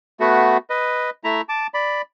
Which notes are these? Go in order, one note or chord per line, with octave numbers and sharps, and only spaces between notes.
A3 B3 F#4
B4 D#5
A3 E4 E5 A#5
A5 D6
D5 B5